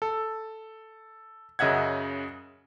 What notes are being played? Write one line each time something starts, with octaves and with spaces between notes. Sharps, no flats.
A4
F#2 C#3 D#5 E5 F#5 G#6